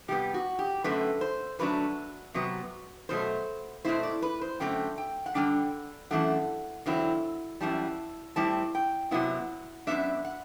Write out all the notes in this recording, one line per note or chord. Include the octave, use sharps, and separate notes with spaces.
C3 G3 B3 G4
F#4
G4
F#2 D3 A3 C4 B4
C5
D3 F#3 A3 D4 B4
C3 F#3 B3
B2 F#3 A3 C5
B2 A3 C4 E4 C5
D5
B4
C5
F#2 D3 A3 C4 G5
G5
F#5
D3 G3 D4 G5
F#2 E3 A3 D4 F#5
E2 D3 F#3 C4 E4
F#2 E3 G3 A5
A2 G3 C4 E4 A5
G5
C3 F#3 B3 E4 F#5
F#2 E3 B3 D4 E5
F#5